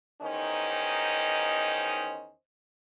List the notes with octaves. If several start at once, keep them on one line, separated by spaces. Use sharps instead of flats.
E2 D#3 C#4 D#4 C5 D#5